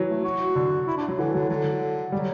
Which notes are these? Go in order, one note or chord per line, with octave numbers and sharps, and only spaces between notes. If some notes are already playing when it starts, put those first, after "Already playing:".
Already playing: E3 F#3
A3
F#4
D3
E4
D4
F#3
D3 E3
D3 F#3
D3 F#3
F#3 G3